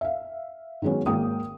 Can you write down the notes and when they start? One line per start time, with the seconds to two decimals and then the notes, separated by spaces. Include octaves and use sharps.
0.01 E5 F5
0.82 D#3 F#3 G#3 B3 C#4
1.06 G#1 G#3 A#3 G5 D#6